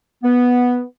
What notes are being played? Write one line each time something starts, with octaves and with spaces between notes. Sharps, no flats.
B3